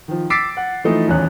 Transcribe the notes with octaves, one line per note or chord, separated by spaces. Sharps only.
D#3 F3
D6 E6 A6 B6 C7 D7
F#5
E3 F3 A3 D#4
D#1 E2 C#4 F#6